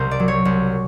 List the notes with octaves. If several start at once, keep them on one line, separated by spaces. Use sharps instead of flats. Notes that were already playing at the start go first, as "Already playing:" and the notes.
Already playing: C2 A#4 C5
D5
F#3
C#5
C2